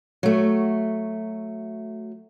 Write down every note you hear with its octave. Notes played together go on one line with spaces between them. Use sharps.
F#3 A3